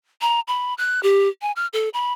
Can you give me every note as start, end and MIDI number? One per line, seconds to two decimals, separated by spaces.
0.21 0.40 82
0.48 0.74 83
0.78 1.02 90
1.03 1.28 67
1.42 1.52 80
1.56 1.67 89
1.73 1.89 69
1.94 2.13 83